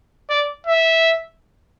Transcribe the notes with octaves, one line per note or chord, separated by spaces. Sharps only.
D5
E5